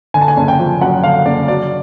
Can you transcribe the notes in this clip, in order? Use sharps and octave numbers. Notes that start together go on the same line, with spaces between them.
D3 G#5
A5
G#5
F#1
G5
F3
F#2 F#5
D3 F5
F#1 D5
F#3 D5